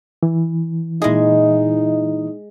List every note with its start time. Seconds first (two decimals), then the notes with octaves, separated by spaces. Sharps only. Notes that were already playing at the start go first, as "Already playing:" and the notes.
0.23 E3
1.02 A#2 G#3 D#4 E4 G#4 D#5